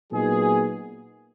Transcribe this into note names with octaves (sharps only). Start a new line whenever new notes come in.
A#2 F#3 B3 D#4 G#4